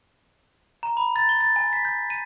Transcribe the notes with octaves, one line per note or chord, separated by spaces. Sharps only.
A#5
B5
A6
G7
A6
G#5
B6
G6
D#7